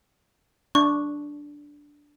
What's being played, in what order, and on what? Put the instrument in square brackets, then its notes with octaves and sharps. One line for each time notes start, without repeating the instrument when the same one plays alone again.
[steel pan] D4 [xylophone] C#6